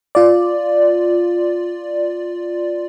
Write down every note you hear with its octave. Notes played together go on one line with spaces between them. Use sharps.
F4 D5